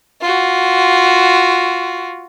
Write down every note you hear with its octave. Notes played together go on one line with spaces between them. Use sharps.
F4 F#4